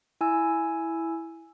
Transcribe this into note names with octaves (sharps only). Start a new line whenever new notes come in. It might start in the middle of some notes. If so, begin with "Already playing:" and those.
E4 G#5 E6